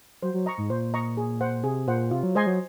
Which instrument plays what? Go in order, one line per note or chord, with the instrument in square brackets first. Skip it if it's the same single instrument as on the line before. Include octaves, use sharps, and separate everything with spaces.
[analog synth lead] F#3 [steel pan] C5
[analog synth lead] F#3
[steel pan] D#5 A#5 C#6
[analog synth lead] G#2
[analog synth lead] A#2 [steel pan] C5
[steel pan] D#5 A#5 C#6
G#4
C5 F#5
[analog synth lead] C3 [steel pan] G#4
[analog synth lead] A#2 [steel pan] C5 F#5
[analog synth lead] C3 [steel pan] F4
[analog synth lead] F#3
[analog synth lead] G#3 [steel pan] C5 D#5 G#5 C6
[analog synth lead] F#3